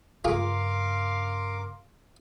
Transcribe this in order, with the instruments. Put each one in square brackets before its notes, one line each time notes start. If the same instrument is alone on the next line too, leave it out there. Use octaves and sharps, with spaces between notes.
[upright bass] G2 C#3 [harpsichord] F4 G#4 [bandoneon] A#4 D6 [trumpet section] F5 C6